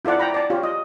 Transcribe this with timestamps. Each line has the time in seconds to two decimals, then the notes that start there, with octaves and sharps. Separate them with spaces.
0.05 E4 F4 A4 D5 F#5
0.19 D5 G5 A#5 B5
0.34 D5 A5
0.50 F4 G4 C#5
0.63 D#5